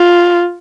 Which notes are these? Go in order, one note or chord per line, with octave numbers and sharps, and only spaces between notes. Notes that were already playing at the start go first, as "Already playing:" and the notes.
Already playing: F4